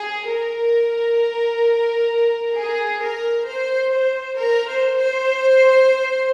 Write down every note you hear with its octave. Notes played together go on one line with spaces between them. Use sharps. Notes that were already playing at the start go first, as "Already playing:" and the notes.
Already playing: G#4
A#4
G#4
A#4
C5
C5
A#4
C5
C5